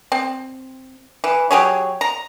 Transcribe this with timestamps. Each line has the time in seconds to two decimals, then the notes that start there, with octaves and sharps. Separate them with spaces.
0.12 C4
1.24 E3
1.51 F#3 G4 G#4 C#5
2.01 A#5